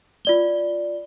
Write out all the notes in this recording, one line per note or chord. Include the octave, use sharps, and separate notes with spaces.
F4 D5 G7